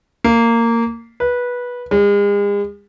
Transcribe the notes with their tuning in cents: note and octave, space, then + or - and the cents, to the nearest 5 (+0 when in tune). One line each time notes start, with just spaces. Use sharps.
A#3 -15
B4 -15
G#3 -40